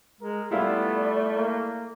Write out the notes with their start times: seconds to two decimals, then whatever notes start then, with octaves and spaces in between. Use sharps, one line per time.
0.21 G#3 A#4
0.51 G3 A3 B3 E4 F4 D5
1.36 A#3